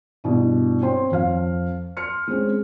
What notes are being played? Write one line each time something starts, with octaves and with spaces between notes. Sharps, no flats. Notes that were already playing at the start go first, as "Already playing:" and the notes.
G2 B2 E4
C4 C#5 G5 C6
F2 F5
C6 F6 C#7
G#3 C4 C#4